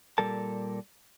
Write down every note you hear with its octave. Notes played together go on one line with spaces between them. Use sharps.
A#2 G3 A4 A#4 A5